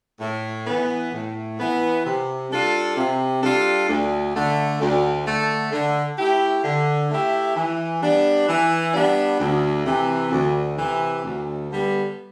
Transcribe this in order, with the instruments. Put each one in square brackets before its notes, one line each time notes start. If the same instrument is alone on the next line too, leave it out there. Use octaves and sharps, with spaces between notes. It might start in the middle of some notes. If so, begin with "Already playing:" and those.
[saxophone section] A2
E3 B3
A2
E3 B3
C3
G3 D4 F4 A4
C3
G3 D4 F4 A4
D2
D3 A3
D2
D3 A3
D3
A3 E4 G4
D3
A3 E4 G4
E3
G3 B3 D4
E3
G3 B3 D4
D2
C3 E3
D2
C3 E3
D2
D3 G3 B3